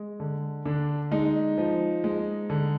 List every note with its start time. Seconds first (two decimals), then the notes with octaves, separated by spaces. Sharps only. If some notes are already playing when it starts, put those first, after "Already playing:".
Already playing: G#3
0.20 D3
0.65 D3 D4
1.11 G#3 D#4
1.58 F3
2.04 G#3
2.50 D3